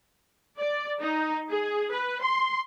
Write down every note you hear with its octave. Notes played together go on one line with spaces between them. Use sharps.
D5
D#4
G#4
B4
C6